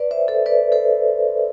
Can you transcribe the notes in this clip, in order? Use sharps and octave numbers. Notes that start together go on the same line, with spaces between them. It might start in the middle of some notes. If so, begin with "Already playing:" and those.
Already playing: B4 D5
C5 E5
A4 C5
B4 D5
A4 C5